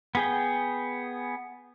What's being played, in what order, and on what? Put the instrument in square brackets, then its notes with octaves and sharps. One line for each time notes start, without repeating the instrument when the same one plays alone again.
[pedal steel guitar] B3 G#4 G5